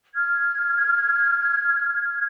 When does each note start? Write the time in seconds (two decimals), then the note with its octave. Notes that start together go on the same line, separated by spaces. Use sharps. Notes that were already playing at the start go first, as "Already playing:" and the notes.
0.14 F6 G#6